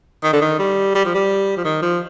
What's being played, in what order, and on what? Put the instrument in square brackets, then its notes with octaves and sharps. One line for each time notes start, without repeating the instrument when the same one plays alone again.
[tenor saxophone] D#3
D3
D#3
G3
G3
F3
G3
F3
D#3
F3